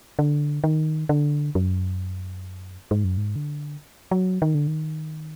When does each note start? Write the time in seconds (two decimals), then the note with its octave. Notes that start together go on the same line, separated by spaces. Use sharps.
0.19 D3
0.64 D#3
1.09 D3
1.55 F#2
2.91 G#2
3.04 F#2
3.18 G#2
3.36 D3
4.11 F#3
4.42 D#3
4.55 D3
4.67 D#3